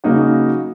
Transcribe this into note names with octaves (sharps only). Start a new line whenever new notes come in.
C#3 F#3 A#3 D#4 F#4